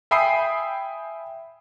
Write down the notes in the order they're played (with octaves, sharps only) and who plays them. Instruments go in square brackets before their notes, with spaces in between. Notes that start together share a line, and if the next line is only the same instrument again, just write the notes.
[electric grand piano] E5 G5 G#5 B5 D#6 C7